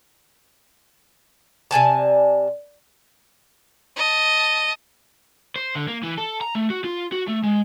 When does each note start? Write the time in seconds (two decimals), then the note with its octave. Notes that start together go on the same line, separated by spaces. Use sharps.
1.71 C3 D5 G#5 A5
3.96 D#5 A5
5.56 C5
5.75 D3
5.88 A#3
6.03 E3
6.18 A4
6.41 A#5
6.55 A3
6.70 F#4
6.84 F4
7.12 F#4
7.28 A3
7.44 G#3